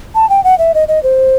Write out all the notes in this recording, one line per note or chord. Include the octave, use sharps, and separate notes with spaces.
A5
G5
F#5
E5
D#5
D#5
C5